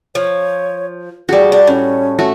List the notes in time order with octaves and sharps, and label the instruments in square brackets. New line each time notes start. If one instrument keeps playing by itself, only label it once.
[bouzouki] F3 [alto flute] C#5
[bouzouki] A2 D5 [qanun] G3 F#4 [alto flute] G#4
[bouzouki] D4
[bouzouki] A2 [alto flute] C#4
[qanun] A3 F#4